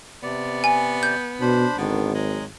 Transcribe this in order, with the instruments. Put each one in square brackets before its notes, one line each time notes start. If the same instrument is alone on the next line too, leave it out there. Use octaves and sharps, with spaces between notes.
[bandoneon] C3 D5 [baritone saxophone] B3
[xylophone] G#5
G6
[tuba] B2 [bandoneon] D4 C5 B5
[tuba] G#1 [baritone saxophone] D3 [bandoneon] D#3 B3
[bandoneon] F#3 [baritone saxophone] G#3